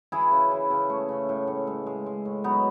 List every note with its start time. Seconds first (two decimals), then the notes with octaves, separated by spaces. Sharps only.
0.12 E3 E4 G#4
0.31 C#3
0.51 E3
0.70 C#3
0.90 A3
1.09 C#3
1.29 A2
1.47 A2
1.67 G#3
1.86 G#3
2.06 G#3
2.25 A2
2.44 F#3 B3 D#4